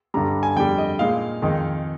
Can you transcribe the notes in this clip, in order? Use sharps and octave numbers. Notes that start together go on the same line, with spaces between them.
G2 D3 G3 A#5
G#5
F2 D3 G3 G5
D#5
A#2 G#3 D#4 F5
F2 D#3 G#3 D#4